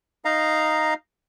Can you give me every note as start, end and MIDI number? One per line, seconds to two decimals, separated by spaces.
0.25 0.94 63
0.25 0.94 75
0.25 0.94 77
0.25 0.94 82